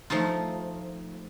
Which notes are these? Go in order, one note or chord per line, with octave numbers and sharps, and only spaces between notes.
F3 A3 D#4 F4